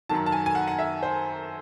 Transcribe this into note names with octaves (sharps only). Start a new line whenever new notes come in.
F#2 D#3 F#3 A5
A5
G#5
G#5
F#5
F#5
E5
C5